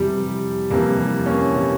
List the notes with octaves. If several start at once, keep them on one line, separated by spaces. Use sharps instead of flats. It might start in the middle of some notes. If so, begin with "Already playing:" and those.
Already playing: F2 C3 E3 G3
F2 C3 E3 G3 A#3
A#3 C#4
C3 E3